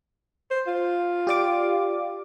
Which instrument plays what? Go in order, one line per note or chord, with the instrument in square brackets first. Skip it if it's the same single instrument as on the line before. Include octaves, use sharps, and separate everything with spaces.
[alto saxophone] C5
F4
[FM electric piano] G4 D5 D6